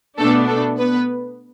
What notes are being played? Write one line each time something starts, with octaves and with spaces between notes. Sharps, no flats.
B2 A3 B3 D4 A4
A3 A4
B3 B4